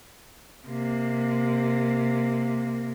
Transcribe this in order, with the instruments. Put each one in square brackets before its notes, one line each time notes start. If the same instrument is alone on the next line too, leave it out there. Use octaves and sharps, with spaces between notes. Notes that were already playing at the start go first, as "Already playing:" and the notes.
[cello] C3 A#3